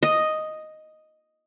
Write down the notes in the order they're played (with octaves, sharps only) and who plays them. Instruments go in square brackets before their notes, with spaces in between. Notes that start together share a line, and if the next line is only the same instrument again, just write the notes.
[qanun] D#5